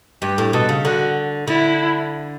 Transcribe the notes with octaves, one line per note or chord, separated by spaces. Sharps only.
G2 G4
A2
B2 A4
C#3
D3 F#4
D3 E4